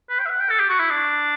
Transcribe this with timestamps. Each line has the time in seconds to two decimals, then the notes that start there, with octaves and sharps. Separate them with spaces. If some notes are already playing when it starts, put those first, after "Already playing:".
0.10 B4
0.20 G5
0.26 E5
0.30 F#5
0.40 G5
0.50 A4
0.60 G4
0.69 F#4
0.80 E4
0.90 D4